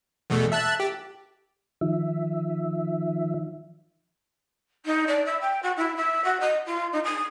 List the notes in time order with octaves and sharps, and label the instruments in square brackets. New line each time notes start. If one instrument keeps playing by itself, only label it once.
[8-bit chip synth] E2 B2 A3
E5 A5 F#6
G4
[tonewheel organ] D#3 F3 E5
[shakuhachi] D#4
D5
E5
G5
F#4
E4
E5
F#4
D#5
F4
D#4
D#6